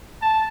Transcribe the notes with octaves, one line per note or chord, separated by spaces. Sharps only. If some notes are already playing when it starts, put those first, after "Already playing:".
A5